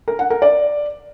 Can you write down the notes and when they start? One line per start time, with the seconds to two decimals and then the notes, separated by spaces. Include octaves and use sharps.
0.08 A#4
0.19 F#5
0.30 A#4
0.42 D5